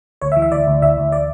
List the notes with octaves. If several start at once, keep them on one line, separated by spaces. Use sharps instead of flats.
D2 C#5
E5
E3
E5
D2 D5
D2
D2 E5
D2
D5